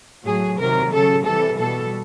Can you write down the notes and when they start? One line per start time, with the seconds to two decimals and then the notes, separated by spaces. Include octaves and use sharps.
0.25 A2 F#3 G#4
0.59 C3 D#3 F#3 A#4
0.92 C#3 F#3 A4
1.26 C3 E3 G3 A4
1.59 B2 G3 A4